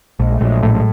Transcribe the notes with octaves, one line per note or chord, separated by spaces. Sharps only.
A#1 G#3
A3
A#1 F#3 G#3
A2